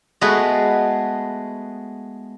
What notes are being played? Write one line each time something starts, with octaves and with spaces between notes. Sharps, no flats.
G#3 A3 B3 F#4 G#4 B4